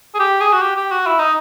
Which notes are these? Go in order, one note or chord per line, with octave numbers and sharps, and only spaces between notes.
G#4
G4
G#4
F#4
G4
G4
F#4
E4
D#4